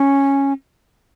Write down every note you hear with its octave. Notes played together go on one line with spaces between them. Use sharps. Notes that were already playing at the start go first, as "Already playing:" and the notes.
Already playing: C#4